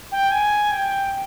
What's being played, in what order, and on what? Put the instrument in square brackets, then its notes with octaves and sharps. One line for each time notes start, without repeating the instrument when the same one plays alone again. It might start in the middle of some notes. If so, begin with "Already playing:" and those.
[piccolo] G5
G#5
G5